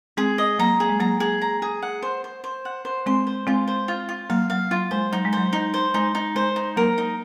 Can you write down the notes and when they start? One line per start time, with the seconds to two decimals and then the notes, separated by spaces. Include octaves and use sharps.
0.17 G#3 C4 G#4
0.38 D#5
0.59 F#3 A#3 A#5
0.80 G#4
0.89 G#3
1.00 F#3 A#3 A#5
1.20 G#4
1.42 A#5
1.62 G#4
1.82 F#5
2.02 C5
2.24 C5
2.44 C5
2.65 F#5
2.85 C5
3.06 G#3 C4 C6
3.27 C5
3.47 G#3 C4 F4
3.68 C5
3.88 F4
4.09 F4
4.30 F#3 A#3 F5
4.50 F#3 F5
4.71 F#3 F4
4.91 G#3 C5
5.13 F#3 D#4
5.25 G#3
5.33 F#3 C5
5.53 D#4
5.74 C5
5.94 G#3 D#4
6.15 D#4
6.35 G#3 C5
6.56 D#4
6.76 F#3 A#3 A#4
6.98 D#4